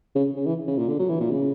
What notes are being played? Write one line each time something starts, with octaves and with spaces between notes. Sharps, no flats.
C#3
C#3
E3
C#3
A#2
D3
F#3
E3
A#2
C#3